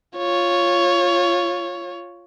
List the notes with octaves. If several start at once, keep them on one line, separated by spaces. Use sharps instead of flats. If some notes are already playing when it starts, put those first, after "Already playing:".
F4 C#5